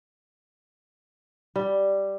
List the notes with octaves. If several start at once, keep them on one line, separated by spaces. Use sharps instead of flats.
G3